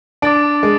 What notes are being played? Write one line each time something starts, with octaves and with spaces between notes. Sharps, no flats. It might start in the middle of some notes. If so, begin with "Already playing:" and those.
D4 D6 A6 D7
G#3